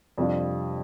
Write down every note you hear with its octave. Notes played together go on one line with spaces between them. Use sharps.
F2 C3 G3 D4 F4